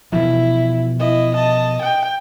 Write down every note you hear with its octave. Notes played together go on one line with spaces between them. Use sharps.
B2 E3 F3 E4
E4 D#5
D#5 A5
G5